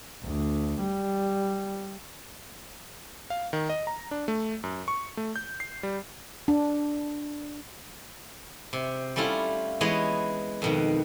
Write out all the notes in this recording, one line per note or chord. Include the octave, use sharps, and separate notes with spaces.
D2
G3
F5
D#3
D#5
A#5
D4
A3
F#2
C#6
A3
G6
C7
G3
D4
C3
G3 A3 C#4 E4 F4
E3 G#3 B3 B4 C#5 D#5
F2 B2 D#3